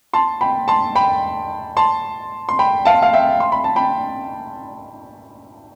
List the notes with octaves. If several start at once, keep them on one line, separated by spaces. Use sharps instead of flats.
A5 C6
G5 B5
A5 C6
G5 B5
A5 C6
C6
G5 B5
F5 A5
F5
E5 G5
C6
B5
A5
G5 B5